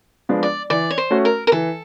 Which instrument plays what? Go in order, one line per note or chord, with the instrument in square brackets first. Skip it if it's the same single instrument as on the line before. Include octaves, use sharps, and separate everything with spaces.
[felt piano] F3 G#3 B3 D4
[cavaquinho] D5
[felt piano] E3 [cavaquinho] D5
[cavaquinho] C#5
C5
[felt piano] A3 C#4 F#4
[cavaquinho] A#4
A#4
[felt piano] E3 [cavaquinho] A4